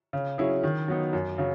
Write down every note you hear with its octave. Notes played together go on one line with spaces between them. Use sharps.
C#3
F#3 C#4 E4 G#4
D#3
F#3 B3 D#4
F#2
C#3 F#3